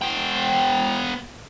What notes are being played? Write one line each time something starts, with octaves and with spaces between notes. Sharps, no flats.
B3 G5